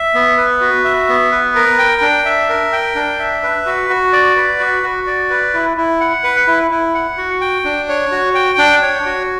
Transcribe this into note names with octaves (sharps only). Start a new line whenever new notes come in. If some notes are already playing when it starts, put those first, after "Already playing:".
Already playing: E5
B3
B4
F#4
E5
B3
B4
A#4
G5
D4
E5
A#4
G5
D4
E5
B4
F#4
F#4
D5
B4
F#4
F#4
D5
B4
E4
E4
F#5
B4
E4
E4
F#5
F#4
G5
D4
C#5
F#4
G5
D4
C#5
F#4